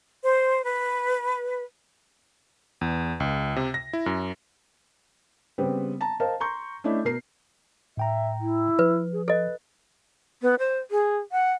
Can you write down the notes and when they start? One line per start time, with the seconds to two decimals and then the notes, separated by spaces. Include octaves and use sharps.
0.23 C5
0.64 B4
2.81 E2
3.20 C#2
3.56 C3
3.74 A#6
3.93 E4
4.06 F#2
5.58 C#3 G3 B3 C4 B4 C5
6.01 A5 A#5
6.20 A#4 C5 D#5 F5 A5
6.40 A#5 C6 C#6 G6
6.84 A3 C#4 D4 E4 D#5
7.05 B2 A#4 C7
7.97 A2 E5 G5 A#5
8.41 E4
8.79 F3 B4
9.13 G#4
9.28 A4 B4 D#5
10.42 B3
10.59 C5
10.91 G#4
11.32 F#5